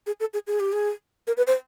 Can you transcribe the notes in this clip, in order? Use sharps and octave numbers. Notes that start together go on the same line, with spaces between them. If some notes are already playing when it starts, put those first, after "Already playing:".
G#4
A4
G#4
G#4
G4
G#4
A#4
B4
C5